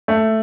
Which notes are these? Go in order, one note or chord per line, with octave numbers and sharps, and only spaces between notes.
A3